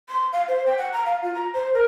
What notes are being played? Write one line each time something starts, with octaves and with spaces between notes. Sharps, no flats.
C6
F5
C5
G5
F#5
A#5
F5
F4
A#5
C5
A#4